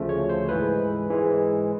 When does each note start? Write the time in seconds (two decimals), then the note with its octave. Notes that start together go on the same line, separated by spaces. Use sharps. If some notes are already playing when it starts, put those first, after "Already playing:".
Already playing: D2 C#3 F3 A3
0.09 C#5
0.29 C5
0.49 G#2 E3 G#3 B4
1.09 G#2 E3 G#3